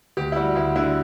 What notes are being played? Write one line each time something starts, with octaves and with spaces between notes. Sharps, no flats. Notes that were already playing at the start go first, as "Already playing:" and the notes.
D2 G4
E4
G3 F#4
D2 E4
D3 E4